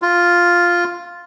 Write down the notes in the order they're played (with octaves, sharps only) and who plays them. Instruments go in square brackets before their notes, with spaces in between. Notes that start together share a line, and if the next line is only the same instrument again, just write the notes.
[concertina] F4